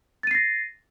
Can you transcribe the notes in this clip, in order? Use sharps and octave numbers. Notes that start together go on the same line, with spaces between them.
A6 A#6 C7 D#7